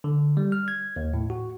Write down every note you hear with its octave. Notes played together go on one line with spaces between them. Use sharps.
D3
G3
F6
G#6
D#2
A2
F#4